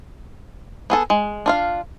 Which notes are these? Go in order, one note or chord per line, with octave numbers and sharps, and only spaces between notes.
B3 G#4 A4
G#3
D4 F4 F5